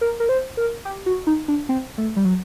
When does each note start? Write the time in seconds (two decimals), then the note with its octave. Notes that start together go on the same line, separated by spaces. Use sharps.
0.01 A#4
0.20 A#4
0.29 C5
0.57 A#4
0.85 G4
1.06 F#4
1.27 D#4
1.48 D4
1.69 C4
1.98 A3
2.16 G3
2.25 F#3